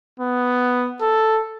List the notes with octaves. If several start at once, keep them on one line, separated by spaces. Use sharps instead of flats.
B3
A4